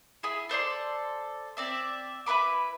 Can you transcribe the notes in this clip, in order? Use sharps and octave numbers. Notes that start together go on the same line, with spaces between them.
E4 G#4 E5
A4 C5 D5 C6
C4 D5 E5
E4 B4 B5 D6